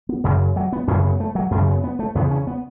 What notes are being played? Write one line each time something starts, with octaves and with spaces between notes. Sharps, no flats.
B3
F#2 C#3 F#3
F#3
B3
F#2 C#3 C#4
B3
A3
F#3
F#2 C#3 A3
B3
B3
A3
E2 C#3 B3
C#4
B3